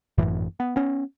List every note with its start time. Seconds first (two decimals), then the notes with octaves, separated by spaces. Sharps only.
0.18 G#1 F#2 A2 E3
0.60 B3
0.76 B3 C#4